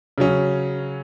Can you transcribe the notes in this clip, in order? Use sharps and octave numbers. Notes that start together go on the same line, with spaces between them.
C#3 F#3 C#4